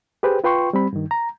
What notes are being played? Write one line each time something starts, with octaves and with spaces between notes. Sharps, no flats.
G4 G#4 B4 C5 G5
F4 B4 G5 C6 C#6
G3 C4 B5
G2 D#3
A#5